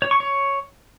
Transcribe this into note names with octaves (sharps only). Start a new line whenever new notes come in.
C#5
C#6
C#5